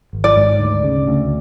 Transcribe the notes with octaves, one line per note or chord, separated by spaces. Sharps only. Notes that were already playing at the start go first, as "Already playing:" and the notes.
G#1
D5
G#2
D2
C#3
D2